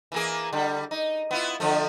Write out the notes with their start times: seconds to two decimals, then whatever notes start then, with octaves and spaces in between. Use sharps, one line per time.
0.12 E3 A#3 G#4
0.53 D3 G3
0.91 D#4
1.31 B3 E4 F4
1.60 D3 F3 A3